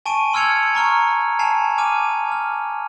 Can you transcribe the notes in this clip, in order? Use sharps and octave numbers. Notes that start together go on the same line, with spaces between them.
G#5 A5 C#6 D7 D#7
C6 E6 F6 G#6 C#7 F7
A#5 C#6 F6
G#5 A5 C7 F7
G#5 D6 F6 D#7
F6